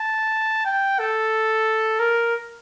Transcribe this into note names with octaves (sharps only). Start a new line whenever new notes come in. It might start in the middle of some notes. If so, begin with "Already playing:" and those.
Already playing: A5
G5
A4
A#4